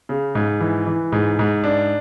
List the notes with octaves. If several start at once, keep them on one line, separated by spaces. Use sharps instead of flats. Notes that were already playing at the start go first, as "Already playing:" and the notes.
C#3
G#2
E3
E3
G#2
G#2
D4